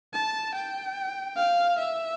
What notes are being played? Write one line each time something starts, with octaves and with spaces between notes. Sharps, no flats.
A5
G5
F5
E5